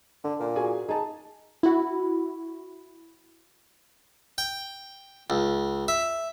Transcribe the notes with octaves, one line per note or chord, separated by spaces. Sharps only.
D3 D4
A#2
F#4 G#4 G#5
D#4 G#4 A5
E4 F#4
G5
C#2
E5